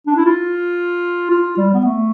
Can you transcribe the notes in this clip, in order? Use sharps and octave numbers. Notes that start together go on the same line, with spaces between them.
D4
E4
F4
F4
G3
B3
A3